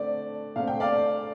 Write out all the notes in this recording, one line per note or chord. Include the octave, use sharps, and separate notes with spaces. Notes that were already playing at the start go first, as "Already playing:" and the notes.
Already playing: D3 A3 C4 D5
D3 A3 C4 F5
G5
D5 F5